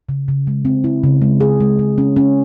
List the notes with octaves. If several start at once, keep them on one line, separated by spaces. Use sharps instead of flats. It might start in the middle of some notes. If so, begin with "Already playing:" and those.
C#3
C#3
G#3
C4
E4
C#3
G#3
G#4
G#3
G#3
C#4
C#4